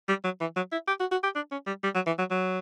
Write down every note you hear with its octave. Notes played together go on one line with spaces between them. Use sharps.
G3
F#3
E3
F#3
E4
G4
F#4
F#4
G4
D4
C#4
G3
G3
F#3
E3
F#3
F#3